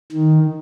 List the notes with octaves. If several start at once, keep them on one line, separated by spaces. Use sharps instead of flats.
D#3